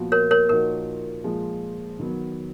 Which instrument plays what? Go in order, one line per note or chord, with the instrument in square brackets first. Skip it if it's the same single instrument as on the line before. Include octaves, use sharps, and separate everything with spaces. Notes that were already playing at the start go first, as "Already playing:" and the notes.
Already playing: [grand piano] A#2 F3 B3 F#4
[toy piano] A#4 C#5
A#4 C#5
[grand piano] A#2 F3 A#3 D#4 F#4 [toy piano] A#4
[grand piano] A#2 F3 G#3
D#3 F#3 B3